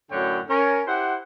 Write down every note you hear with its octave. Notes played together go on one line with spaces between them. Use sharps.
F#2 A2 D3 C#5 F#5 G5
C#4 A#4
E4 G4 C5 F#5